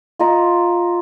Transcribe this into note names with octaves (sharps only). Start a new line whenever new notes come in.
F4 D#5 A#5